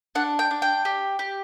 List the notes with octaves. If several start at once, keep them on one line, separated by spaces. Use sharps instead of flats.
D4 F#5
G5
D4
G5
G4
G4